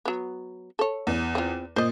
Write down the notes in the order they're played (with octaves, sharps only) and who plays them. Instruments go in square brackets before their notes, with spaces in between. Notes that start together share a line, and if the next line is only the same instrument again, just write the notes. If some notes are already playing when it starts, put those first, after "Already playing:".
[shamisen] F#3 B3
A4 C#5
[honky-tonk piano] E2
[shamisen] C4 F4
[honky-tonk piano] A#2 [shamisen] C5 D#5